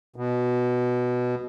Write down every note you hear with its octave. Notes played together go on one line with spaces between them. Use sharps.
B2